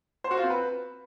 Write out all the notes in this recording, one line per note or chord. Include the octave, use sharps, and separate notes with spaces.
C5
F#4
F4
C4
B4